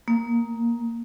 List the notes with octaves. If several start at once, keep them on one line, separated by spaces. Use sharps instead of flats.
A#3